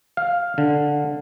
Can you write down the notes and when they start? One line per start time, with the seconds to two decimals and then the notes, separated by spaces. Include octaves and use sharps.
0.17 F5
0.58 D3